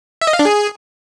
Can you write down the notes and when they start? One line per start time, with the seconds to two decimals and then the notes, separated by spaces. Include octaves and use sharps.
0.21 E5
0.27 D#5
0.33 F5
0.39 D4
0.45 G#4